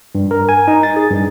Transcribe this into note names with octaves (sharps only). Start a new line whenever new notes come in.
G2
A#4
G#5
D#4
A6
G#4
G2